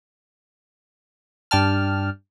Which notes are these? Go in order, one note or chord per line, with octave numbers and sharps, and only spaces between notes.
G2 D5 G5 A5 F6